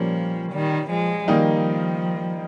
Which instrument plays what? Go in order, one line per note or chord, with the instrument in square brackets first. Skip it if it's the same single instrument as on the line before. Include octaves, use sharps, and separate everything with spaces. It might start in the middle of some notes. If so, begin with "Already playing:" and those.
Already playing: [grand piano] A#2 G3 A#3 C#4 [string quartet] F3
[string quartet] D#3 G3
F3 G#3
[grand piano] D#3 G3 A#3 D#4 [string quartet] F3